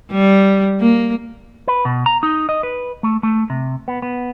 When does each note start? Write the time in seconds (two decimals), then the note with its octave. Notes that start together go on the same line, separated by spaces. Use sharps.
0.11 G3
0.81 A#3
1.68 B4
1.85 B2
2.06 A#5
2.23 D#4
2.49 D#5
2.63 B4
3.03 A3
3.23 A3
3.50 C3
3.88 B3
4.02 B3